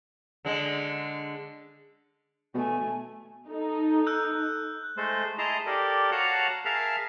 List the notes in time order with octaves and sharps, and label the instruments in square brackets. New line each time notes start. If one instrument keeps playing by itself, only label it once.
[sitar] D3 G#3
[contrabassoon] B2 [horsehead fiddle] A3 G#5
[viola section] D#4 A4
[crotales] E6 F#6 G6
[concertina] G#3 A3 A4 C5
E4 G#4 D#5 A5 A#5 C6
G4 A4 A#4 D5
F#4 C#5 F5 F#5 A5 A#5
G#4 A#4 E5 F5 A5 F6